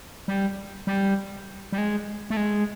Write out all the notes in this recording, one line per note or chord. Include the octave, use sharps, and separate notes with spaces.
G3
G3
G3
G#3
A3
G#3